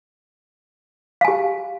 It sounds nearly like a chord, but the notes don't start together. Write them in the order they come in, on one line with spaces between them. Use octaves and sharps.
F5 G#5 G4